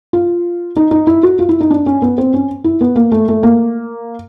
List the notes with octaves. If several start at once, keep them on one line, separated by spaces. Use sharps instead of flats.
F4
D#4
D#4
E4
F#4
F4
E4
D#4
D4
C#4
B3
C4
C#4
E4
B3
A#3
A3
A3
A#3